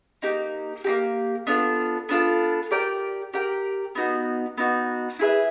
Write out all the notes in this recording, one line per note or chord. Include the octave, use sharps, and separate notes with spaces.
A#3 D#4 G4
A#3 D#4 G4
B3 D4 F4 A4
B3 D4 F4 A4
G4 A#4 D5 G5
G4 A#4 D5 G5
B3 D#4 F#4
B3 D#4 F#4
E4 G#4 B4 E5